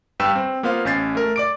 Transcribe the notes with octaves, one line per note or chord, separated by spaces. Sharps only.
G2 B4 G5 E6 E7
C4
A#3 B3 F4 C5 F5
A1 C#4 G6 A6 C7
A3 A#4
D5 D6 D7